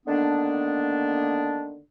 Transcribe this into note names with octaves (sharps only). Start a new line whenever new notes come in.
D3 D#3 A#3 B3 D4